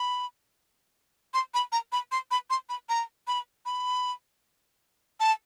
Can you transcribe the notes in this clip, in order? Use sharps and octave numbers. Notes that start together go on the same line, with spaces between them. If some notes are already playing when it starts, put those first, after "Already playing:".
Already playing: B5
C6
B5
A#5
B5
C6
B5
C6
B5
A#5
B5
B5
A5